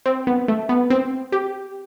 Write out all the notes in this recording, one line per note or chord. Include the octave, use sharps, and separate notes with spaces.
C4
B3
A3
B3
C4
G4